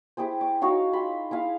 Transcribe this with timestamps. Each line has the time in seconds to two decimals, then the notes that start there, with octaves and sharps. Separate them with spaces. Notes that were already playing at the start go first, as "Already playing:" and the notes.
0.17 E4 G4 G#4 C5
0.41 D6
0.61 D#4 F#4 C#5 F5
0.93 F4 B5 C6
1.31 E4 G#4 F5